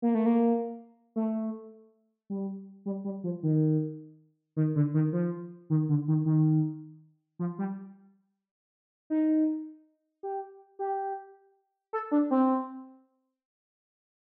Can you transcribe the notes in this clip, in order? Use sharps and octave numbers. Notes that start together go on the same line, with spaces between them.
A#3
A3
A#3
A3
G3
G3
G3
F3
D#3
D#3
D3
D#3
F3
D#3
D3
D#3
D#3
F3
G3
D#4
G4
G4
A4
D4
C4